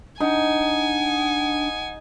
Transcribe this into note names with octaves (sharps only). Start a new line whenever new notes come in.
D4 D#4 F#5 G#5